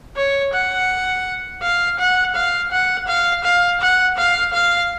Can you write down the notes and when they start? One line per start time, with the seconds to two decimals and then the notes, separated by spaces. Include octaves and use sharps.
0.17 C#5
0.53 F#5
1.63 F5
1.99 F#5
2.35 F5
2.72 F#5
3.08 F5
3.44 F5
3.81 F#5
4.18 F5
4.53 F5